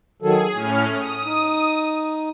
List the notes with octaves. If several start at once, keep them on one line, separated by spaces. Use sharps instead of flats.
D#3 F#3 G#4 A4
A2 C#4 G#5 F6
D#6
D#4